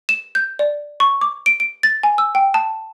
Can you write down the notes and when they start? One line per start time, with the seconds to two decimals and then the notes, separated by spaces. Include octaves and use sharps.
0.09 E7
0.35 G6
0.59 D5
1.00 C#6
1.21 D6
1.46 D7
1.60 D7
1.83 A6
2.03 G#5
2.18 E6
2.35 G5
2.54 A5